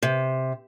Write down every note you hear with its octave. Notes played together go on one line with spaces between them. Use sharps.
C3